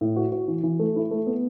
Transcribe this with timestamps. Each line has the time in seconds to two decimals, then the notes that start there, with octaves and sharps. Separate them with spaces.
0.01 A2
0.16 F#4
0.32 F#4
0.48 E3
0.63 E3
0.79 A3
0.96 E4
1.11 A3
1.26 B3